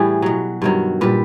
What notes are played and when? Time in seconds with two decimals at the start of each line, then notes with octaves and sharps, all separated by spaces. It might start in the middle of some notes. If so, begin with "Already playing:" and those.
Already playing: A2 E3 G3 G#4
0.22 B2 F#3
0.62 G2 D#3 F#3
1.01 A#2 G3 B4